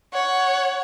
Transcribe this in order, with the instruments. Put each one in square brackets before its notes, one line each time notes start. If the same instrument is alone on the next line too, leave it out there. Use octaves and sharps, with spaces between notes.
[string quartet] C#5 F#5